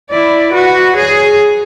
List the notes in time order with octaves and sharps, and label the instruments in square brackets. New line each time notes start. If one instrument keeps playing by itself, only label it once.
[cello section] E4 [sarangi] D5
[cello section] F#4 [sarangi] B4
[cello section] G#4 [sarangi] C#5